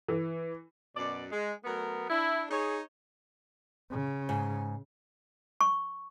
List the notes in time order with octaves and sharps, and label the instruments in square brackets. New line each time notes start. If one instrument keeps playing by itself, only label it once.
[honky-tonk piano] E3
[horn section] F#2 B2 D5
G#3
F#3 A3 B3 A#4
D4 E4
D#4 G#4 C#5
[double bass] C#3
[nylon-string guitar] G#2
[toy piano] C#6